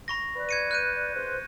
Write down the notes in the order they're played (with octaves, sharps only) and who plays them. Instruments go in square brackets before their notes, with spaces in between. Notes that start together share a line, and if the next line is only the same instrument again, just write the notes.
[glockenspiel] B5 C#6 A#6
[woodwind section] B4 D5
[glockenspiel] G#6 C#7 D#7
F#6 G6 D#7
[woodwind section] G#2 B4 C5